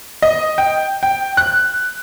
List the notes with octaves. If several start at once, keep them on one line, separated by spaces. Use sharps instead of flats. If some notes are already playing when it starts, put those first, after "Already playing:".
D#5
G5
G5
F#6